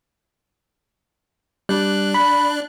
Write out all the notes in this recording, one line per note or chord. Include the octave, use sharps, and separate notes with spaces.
G3 D4 F#6
B5